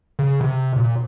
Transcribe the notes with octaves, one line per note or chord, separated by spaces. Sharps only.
C#3
C3
A#2